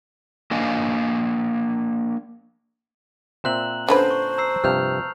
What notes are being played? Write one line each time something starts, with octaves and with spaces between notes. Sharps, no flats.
A#3 D4 D#5 F5 G#5
A#2 C4 E5 A#5 F#6 F#7
D3 C#4 B4 C5 A5
C#6
A#5 E6 C7
G2 C3 F3 F6 G6 F7